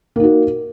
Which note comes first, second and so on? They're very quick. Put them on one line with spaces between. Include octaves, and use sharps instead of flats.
A#3 D#4 F#4